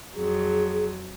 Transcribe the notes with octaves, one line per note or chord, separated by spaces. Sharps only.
F2 F#3 G#4